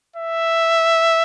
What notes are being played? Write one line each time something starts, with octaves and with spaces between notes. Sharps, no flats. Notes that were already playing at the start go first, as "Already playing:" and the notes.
E5